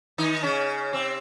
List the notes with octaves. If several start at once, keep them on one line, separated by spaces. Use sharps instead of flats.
D#3 D#4
C#3 C#4
C3 C4